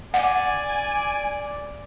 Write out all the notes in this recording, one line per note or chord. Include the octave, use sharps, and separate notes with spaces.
D5 F#5 G#5